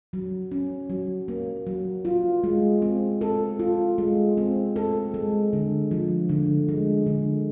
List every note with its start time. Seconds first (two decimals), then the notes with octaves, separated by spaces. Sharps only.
0.13 F#3
0.51 C#4
0.90 F#3
1.28 A#3
1.67 F#3
2.05 F4
2.44 G#3
2.82 C4
3.21 A4
3.59 F4
3.98 G#3
4.37 C4
4.76 A4
5.14 G#3
5.53 D3
5.91 F3
6.29 D3
6.68 G#3
7.06 D3